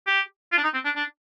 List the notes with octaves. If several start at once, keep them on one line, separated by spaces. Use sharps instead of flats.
G4
F4
D4
D#4
C4
D4
D4